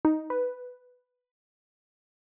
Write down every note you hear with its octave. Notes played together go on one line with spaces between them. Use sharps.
D#4
B4